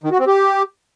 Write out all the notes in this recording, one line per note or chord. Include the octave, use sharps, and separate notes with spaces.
D#3
F#4
C4
G4